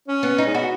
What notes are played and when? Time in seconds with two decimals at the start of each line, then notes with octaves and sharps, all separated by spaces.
0.08 C#4
0.23 B3
0.38 D#4
0.46 G#3
0.54 B3 F#4